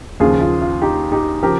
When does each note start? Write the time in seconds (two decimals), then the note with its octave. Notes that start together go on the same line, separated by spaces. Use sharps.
0.20 D#2 C#3 F3 F4 G#4
0.41 F4
0.62 F4
0.82 D#4 G4
1.12 D#4 G4
1.43 C#3 F3 G4 A#4